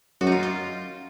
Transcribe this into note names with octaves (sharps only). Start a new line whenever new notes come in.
F#2 F#4
D#4
F4
F4